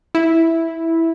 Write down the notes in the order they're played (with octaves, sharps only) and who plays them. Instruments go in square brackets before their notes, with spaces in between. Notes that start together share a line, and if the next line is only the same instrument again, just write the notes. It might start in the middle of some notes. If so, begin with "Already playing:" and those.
[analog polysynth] E4